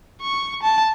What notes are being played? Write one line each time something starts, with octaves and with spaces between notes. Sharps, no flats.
C#6
A5